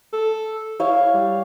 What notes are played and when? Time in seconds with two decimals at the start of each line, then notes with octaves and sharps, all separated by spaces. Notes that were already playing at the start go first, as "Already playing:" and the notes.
0.13 A4
0.80 E4 C#5 F5
1.14 G3